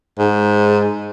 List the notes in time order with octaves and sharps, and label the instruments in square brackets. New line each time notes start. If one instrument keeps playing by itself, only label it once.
[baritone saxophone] G#2